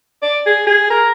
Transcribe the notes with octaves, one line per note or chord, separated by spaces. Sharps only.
D5
G#4
G#4
A#4